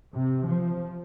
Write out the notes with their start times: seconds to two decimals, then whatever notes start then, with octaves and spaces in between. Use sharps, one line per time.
0.14 C3
0.47 F3